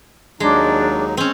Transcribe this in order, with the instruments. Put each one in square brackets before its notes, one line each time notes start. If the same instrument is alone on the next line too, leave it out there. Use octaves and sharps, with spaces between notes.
[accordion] D#2 F#3 D#4 [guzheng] G#3 [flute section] D4
[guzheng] C4 C#4